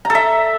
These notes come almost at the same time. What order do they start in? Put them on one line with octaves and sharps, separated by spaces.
A#5 A4 E5